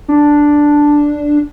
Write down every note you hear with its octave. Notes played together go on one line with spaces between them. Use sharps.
D4